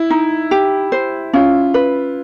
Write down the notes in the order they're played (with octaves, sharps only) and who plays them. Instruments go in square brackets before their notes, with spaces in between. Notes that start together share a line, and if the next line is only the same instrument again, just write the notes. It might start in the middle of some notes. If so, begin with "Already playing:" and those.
Already playing: [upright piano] E4
[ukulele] D#4
G4
C5
[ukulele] C#4 [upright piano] F4
[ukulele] B4